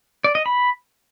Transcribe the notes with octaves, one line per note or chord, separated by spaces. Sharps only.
D5
D#5
B5